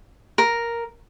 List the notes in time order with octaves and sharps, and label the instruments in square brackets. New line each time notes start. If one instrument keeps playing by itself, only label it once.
[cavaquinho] A#4